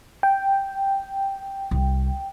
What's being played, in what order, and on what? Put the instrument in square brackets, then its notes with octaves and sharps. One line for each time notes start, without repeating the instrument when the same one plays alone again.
[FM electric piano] G5
[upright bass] C2